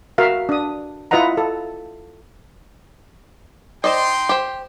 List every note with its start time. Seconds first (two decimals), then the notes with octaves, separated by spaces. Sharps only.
0.18 F#4 A#4 E5 F5
0.49 D4 D#6
1.11 E4 F4 B4 D#5 F#5 A#5
1.37 A4
3.84 D#4 C5 D5 D#5 G5 C6
4.29 G4 C5